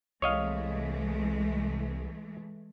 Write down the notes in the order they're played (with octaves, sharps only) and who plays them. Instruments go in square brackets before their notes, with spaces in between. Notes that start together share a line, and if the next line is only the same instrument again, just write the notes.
[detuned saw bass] C2 [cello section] E3 G#3 A3 [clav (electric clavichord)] C#5 D#5 F5